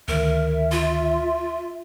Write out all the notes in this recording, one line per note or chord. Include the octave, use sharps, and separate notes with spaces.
D2 D#3 A#4 E5
F4